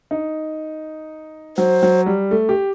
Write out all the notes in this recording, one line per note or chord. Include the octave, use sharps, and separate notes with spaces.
D#4
F#3 C5
F#3
G3
A3
G4